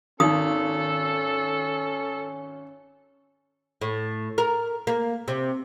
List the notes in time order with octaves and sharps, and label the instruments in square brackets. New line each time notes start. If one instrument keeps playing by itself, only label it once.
[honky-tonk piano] G#1 [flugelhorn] C#4 [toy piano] D#4 D#6 [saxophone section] A4
[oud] A2
A#4
A#3
C3